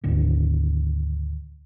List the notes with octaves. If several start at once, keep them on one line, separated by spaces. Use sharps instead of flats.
D2 G#2 D3 D#3